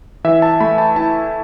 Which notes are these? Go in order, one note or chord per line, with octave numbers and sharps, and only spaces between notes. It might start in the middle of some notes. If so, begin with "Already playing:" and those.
E3 E5
A5
A3 B5
A5
E4 A5